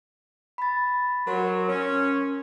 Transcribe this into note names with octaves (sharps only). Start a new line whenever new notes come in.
B5 A6
F#3 A#4 C6
C#4